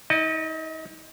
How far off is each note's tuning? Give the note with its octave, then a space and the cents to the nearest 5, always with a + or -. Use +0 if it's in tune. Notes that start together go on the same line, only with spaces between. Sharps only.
D#4 +40 D#5 -30